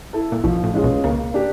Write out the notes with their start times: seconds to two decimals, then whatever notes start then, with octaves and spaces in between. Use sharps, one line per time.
0.13 E4 A4
0.32 A#2
0.44 B1 B2 F3
0.64 A1 A2
0.74 G#3 C#4 F4 G#4
0.83 B1 B2
1.04 C#2 C#3 A#3
1.34 D4 G4